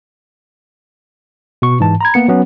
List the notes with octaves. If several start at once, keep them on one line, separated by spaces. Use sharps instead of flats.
B2 C#6
G#2 E3 A5
A#5 B5 G#6
A#3 B3 C#7
F#3 B3 C#4